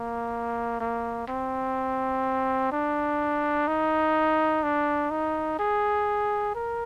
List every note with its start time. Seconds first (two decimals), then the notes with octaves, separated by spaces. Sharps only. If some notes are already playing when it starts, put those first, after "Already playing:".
Already playing: A#3
0.80 A#3
1.28 C4
2.72 D4
3.67 D#4
4.63 D4
5.11 D#4
5.59 G#4
6.55 A#4